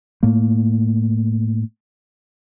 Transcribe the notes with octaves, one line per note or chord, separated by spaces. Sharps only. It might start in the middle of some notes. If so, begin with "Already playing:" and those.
A2 A3 A#3